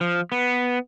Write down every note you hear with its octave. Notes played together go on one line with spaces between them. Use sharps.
F3
B3